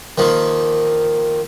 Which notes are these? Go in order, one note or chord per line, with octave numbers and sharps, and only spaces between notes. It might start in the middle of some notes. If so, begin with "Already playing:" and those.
D#3 F3 A#3